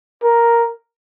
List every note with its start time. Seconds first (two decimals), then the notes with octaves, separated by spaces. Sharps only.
0.24 A#4